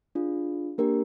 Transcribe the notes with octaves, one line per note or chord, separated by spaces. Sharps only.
D4 F4 G#4
A#3 D4 G4 A#4